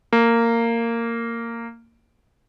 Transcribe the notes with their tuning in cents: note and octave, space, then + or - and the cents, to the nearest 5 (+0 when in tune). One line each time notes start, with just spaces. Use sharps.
A#3 -15